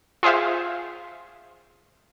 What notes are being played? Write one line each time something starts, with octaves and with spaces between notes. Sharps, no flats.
F4 G#4 C5 E5 F5